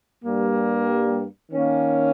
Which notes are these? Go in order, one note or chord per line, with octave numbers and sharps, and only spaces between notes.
G2 G3 A#3
D#3 A#3 C#4